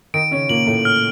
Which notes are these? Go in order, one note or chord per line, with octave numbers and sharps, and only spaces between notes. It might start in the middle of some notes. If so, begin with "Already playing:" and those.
D#3 D#4 D7
C#3 C#4
A#2 A#3 F#7
A2 A3
F6